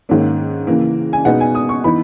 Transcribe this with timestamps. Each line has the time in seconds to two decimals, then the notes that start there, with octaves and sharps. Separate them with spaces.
0.09 G#2 D#3 A#3 C#4
0.67 C#3 E3 A#3
1.13 G#5
1.25 B2 G#3 B3 D#4 F#5
1.40 G#5
1.55 D#6
1.69 C#6
1.84 E3 B3 D#4 B5